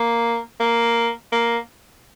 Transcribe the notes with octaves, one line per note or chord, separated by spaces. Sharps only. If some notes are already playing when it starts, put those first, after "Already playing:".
Already playing: A#3
A#3
A#3